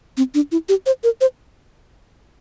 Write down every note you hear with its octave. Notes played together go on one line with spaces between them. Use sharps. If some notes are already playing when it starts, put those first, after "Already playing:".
C4
D4
E4
G4
C5
A#4
C5